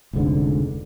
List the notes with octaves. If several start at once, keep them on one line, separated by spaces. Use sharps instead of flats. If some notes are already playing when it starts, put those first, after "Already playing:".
F1 C#2 G#2 D3